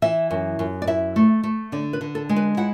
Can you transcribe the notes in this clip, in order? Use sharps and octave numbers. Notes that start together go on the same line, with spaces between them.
E3 E5
F#2
F#2
D5
E4 E5
A3
A3
D3 D5
B4
D3
A4
G#3
B4
E4 F#5